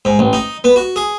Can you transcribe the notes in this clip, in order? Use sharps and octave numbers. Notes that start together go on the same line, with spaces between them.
G#2
A1
D#4
B3
F#4
G#4